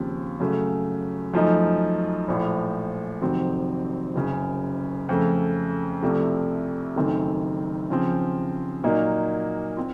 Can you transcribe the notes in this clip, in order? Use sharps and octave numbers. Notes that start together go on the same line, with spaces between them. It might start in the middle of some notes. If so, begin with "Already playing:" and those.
Already playing: D#2 C#3 F3 C4
F#2 C#3 F#3 A3
F#2 F3 A3 D#4
A#1 A2 F3
F1 F2 D#3 F#3 C4
F#1 F#2 C#3
F2 C#3 A3
C2 C3 F3 A3
F#1 F#2 D#3 A3 C4
C#3 F3 C4
A#2 F#3 A#3 D#4
C4 F4